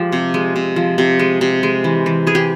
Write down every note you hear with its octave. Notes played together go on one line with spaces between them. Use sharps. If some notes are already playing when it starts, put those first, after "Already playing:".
Already playing: F3 G#3 G4
C3
G#3
C3
F3
C3
G#3
C3
G#3
E3
E3
G#3 G#4
G4